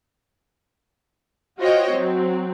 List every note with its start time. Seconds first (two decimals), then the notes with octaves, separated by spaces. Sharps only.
1.59 F4 F#4 C5 C#5 D#5 G5
1.91 F#3 C4